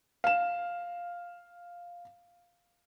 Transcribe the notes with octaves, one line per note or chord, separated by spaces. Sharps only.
F5 E7